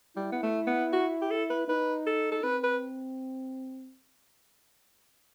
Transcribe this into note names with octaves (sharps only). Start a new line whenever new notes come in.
G3 E4
B3
A3
B3
F#4
G4
A4
B4
D#4 B4
A4
A4
C4 B4
B4